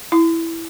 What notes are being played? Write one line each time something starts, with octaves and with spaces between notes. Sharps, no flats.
E4